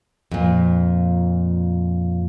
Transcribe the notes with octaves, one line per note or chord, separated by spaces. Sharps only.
F2 A#2